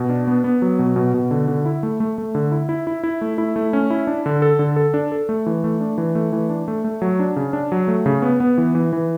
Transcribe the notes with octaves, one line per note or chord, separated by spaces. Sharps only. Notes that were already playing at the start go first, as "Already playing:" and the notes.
Already playing: B2
D4
B3
B3
F#3
B2
B2
B2
D3
D3
E4
A3
A3
A3
D3
E4
E4
E4
E4
A3
E4
A3
C#4
E4
D4
D3
A4
D3
A4
D4
A4
A3
E3
A3
D4
E3
A3
E3
D4
A3
A3
F#3
D4
C#3
D4
F#3
A3
C#3
B3
B3
E3
E3
E3